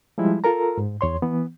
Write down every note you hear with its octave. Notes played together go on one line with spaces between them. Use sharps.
F3 G3 G#3 E4
F4 A4 A#4 A#5
G#2
E2 C#5 C6
E3 B3